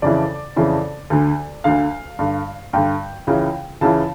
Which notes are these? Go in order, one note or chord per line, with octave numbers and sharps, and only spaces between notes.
F2 C#3 E3 D5
F2 C#3 E3
D2 D3
D2 D3 F5
G2 D3
G2 D3 G5
C#2 C#3 E3
C#2 C#3 E3 A5